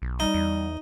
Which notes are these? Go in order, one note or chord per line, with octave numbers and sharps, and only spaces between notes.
B1
G3 D#4
E2